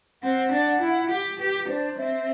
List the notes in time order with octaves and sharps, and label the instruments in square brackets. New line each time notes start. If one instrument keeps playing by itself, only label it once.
[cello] C4 [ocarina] F#5
[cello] D4
E4
G4
[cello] G4 [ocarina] B4
[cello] D4 [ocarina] C5
[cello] C4 [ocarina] E5